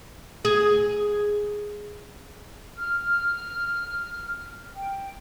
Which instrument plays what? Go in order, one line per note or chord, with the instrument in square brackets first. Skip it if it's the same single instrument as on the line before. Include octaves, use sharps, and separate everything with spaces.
[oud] G#4
[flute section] F6
G5